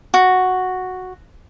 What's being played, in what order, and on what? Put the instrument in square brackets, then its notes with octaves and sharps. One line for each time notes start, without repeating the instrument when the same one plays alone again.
[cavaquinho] F#4